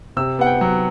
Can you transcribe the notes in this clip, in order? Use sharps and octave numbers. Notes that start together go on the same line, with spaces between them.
C3 E6
B3 F#5
G5
F#3